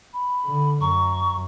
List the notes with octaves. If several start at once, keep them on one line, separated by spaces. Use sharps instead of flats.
B5
D3
F#2 A#5 C#6